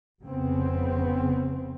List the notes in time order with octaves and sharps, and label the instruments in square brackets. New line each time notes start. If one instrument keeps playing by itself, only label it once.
[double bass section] F1 C#3 B3 C4